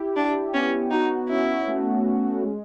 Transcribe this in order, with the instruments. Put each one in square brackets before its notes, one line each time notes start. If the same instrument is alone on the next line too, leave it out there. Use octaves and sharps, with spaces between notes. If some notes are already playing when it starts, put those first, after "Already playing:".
Already playing: [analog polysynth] E4 G4
[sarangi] D4 [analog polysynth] E4
[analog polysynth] B3 [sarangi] C#4
[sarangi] D#4 [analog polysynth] F#4
[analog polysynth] C#4 [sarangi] E4
[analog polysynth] A3
C#4
G#3